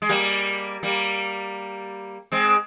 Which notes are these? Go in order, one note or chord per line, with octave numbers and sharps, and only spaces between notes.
G#3
G3 A#3
G3 A#3
G#3 C4